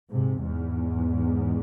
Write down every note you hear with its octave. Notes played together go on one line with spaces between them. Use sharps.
G#2 C3
E2 G#2